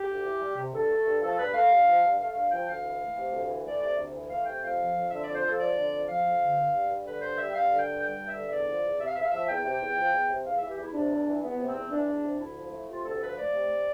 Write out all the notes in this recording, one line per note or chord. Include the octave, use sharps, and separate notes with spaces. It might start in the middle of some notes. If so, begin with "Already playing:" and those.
Already playing: G4
D2
E3
G3
C3
G2 A4
A3
G2
F3 A4
G2 B4
A3 F5
G2
F3
G2
A3 F5
G2 F5
F3 G5
D2 F5
E3
A3
C3
D2
E3
A3 D5
C3 D5
D2
E3
A3 F5
C3 G5
F2 F5
F3
F2
D3 E5
F2 D5
C5
F3 A4
F2 D5
D3
F2
F3 F5
F2
D3
G2
G3
G2
D3 B4
G2 C5
G3 E5
G5
G2 F5
D3
G5
G2
G3 G5
G2
E5
D3
E2 D5
F3
E2
C3 E5
F5
E2 E5
F5
F3 E5
E2 G5
C3
E2
F3
E2
C3
E2 F5
E3 E5
G4
E2 E4
C3 D4
E2
E3
E2 B3
C3
C4
E2
E3 D4
E2
C3
D2 E4
F3
A3
C3 F4
D2 A4
F3 B4
A3 D5
C3